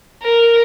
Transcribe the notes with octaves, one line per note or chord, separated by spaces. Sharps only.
A#4